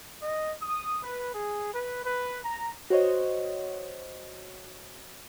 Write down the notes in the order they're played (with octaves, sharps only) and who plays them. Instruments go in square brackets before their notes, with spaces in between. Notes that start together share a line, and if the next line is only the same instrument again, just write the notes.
[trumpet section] D#5
D#6
B4
G#4
B4
B4
A#5
[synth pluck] F#4 C5 C#5 D#5